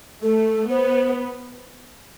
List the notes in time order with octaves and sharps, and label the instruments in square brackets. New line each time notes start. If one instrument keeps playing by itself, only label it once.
[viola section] A3 [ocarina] A4
[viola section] B3 [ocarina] C5